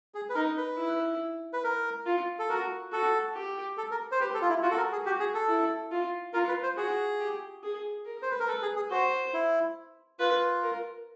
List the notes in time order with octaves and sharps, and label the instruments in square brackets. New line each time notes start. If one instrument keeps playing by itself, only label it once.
[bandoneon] G#4
B4
[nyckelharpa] D#4 [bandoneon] A#4
[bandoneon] B4
[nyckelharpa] E4
[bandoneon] B4
A#4
[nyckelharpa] F4
[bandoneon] A4
[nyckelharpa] F#4 [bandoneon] A#4
[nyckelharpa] F#4 [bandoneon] A4
[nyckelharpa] G4
[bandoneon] A4
A#4
C5
[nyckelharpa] G4 [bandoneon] B4
[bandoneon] A4
F4
E4
[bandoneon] F4 [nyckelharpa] F#4
[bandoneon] A4
A#4
G#4
[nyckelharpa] F#4 [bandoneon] G4
[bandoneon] G#4
A4
[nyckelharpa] E4
F4
[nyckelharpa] F4 [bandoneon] A#4
[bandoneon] B4
C5
[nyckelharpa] F#4 [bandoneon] G#4
[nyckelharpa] G4
G#4
A#4
[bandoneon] C5
B4
A#4
[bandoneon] A4 [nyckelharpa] B4
[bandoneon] G#4
G#4
[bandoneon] F#4 [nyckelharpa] C5
[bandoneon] E4
[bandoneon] F4 [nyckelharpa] B4
[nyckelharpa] A#4